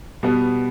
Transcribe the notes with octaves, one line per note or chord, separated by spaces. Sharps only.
B2 G3 B3